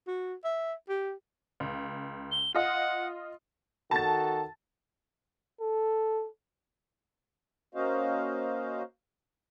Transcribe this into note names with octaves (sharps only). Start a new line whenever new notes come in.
F#4
E5
G4
C#2
G7
F4 D#5 F#5
D#3 F#4 A4 A5 A6
A4
A#3 C#4 F#4 C5 D#5 F5